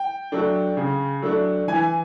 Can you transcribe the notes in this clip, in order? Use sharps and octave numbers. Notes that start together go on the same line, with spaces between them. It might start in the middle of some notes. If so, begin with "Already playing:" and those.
Already playing: G5
F#3 A3 D4
C#3
F#3 A3 D4
E3 G#5